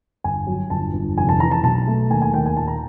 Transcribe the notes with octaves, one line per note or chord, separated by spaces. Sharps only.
G1 G#5
F#3
G1 A5
G1
F1 G#5
A5
E3 A#5
A5
B1 A5
A3
D#2 G#5
G#5
D#2 G5
G#5
A#2 A5
A#5